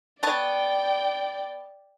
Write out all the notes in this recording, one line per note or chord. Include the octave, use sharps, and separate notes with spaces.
B3 C#5 D5 G5 A5